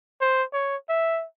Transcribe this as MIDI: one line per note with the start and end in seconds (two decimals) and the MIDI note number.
0.21 0.43 72
0.53 0.76 73
0.89 1.25 76